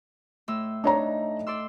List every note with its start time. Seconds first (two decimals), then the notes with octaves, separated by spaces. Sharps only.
0.48 A2 C6 E6
0.84 D4 D#4 C#5 A#5
1.47 D5 C6 E6